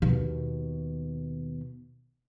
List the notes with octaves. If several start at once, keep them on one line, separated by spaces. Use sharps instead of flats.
D#2 B2